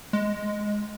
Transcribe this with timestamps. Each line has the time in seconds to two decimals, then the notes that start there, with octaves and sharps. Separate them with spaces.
0.13 G#3